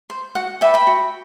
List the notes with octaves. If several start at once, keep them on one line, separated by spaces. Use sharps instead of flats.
C5
F#4 F#5
B4 D5 E5 G5
G5 B5
F#4